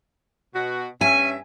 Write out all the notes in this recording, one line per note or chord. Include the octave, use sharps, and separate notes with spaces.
B2 F#4
G2 C#4 E5 G#5